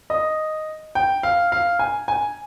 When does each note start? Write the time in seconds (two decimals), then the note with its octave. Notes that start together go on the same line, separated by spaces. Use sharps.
0.10 D#5
0.95 G5
1.23 F5
1.52 F5
1.79 G#5
2.08 G#5